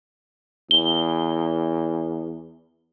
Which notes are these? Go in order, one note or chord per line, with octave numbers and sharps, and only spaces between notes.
E2 G7